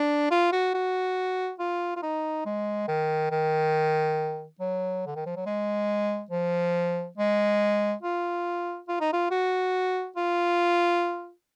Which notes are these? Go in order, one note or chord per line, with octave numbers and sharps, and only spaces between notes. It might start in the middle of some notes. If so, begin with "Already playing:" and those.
Already playing: D4
F4
F#4
F#4
F4
F4
D#4
G#3
D#3
D#3
F#3
D3
D#3
F3
F#3
G#3
F3
G#3
F4
F4
D#4
F4
F#4
F4